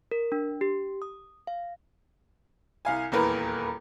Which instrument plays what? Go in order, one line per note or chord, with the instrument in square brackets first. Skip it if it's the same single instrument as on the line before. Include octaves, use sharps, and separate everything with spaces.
[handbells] A#4
D4
G4
D#6
F5
[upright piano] C2 F5 G#5
D#1 E2 A#3 A#4 B4